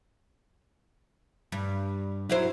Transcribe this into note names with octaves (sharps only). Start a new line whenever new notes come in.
G2
F#3 E4 C5